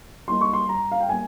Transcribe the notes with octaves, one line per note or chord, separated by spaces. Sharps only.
G3 A#3 D#4 C6
C#6
C6
G2 A#5
F5
G5
G3 A#3 D#4 G#5